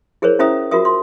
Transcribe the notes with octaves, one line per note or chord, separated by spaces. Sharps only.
E4 G#4 A#4 C5 C#5
C#4 E4 C5 E5 A#5 D#6
F4 F#4 A#4 E5 D#6
C6